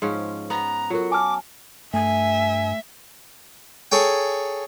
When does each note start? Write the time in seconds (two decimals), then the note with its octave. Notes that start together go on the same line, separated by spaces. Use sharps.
0.02 G#2 F3 C#4
0.50 B3 A#5
0.90 F#3 F4 F#4 A4 A#4
1.11 G#5 A5 D6 F6
1.94 G2 A3 E5 G#5
3.92 G#4 A4 C#5 G5